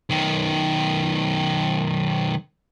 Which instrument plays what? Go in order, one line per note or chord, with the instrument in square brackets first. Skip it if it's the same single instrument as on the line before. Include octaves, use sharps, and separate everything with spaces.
[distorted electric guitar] B1 D#3